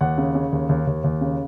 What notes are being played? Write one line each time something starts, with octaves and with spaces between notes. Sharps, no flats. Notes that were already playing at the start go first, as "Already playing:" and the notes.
D#2 F#5
C#3
C#3
D#2
D#2
D#2
D#2
C#3